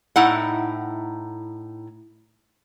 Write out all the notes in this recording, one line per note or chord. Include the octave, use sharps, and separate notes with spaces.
A2 D#4 E4 F#5